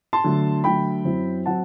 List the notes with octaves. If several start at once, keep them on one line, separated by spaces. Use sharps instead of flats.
A5 C6
D3 F#3 A3
D3 F#3 A3 G5 B5
F#2 F#3 C4 E4
F#3 C4 F#5 A5